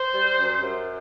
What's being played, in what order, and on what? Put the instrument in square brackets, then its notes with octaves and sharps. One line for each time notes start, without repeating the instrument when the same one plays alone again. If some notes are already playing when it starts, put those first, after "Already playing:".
Already playing: [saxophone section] C5
G3
F#2
F#2